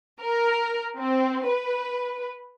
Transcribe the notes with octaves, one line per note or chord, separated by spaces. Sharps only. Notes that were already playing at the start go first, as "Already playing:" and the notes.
A#4
C4
B4